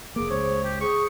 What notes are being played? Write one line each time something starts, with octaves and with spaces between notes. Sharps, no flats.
F1 A#3 G#4 D6
C#2 C5 C#5
G4
G#4 C#6